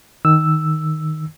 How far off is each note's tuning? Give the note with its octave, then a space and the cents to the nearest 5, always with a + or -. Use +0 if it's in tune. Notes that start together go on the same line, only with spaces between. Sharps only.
D#3 +0 E6 +0